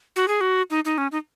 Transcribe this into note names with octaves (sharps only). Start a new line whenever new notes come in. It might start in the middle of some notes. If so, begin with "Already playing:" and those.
F#4
G#4
F#4
D#4
D#4
C#4
D#4